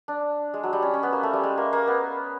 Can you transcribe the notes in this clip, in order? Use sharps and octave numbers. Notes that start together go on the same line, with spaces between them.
D4
G#3
F#3
G3
C#4
C#4
B3
A#3
A3
G3
G#3
A#3
A#3
B3